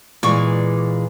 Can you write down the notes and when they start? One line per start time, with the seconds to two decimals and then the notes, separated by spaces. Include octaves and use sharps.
0.23 A#2 E3 G#3 D5 C#6